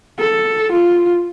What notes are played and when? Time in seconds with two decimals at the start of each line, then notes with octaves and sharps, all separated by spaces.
0.19 A4
0.72 F4